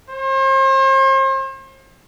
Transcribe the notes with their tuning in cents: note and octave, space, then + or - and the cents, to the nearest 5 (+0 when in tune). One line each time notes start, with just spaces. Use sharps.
C5 +40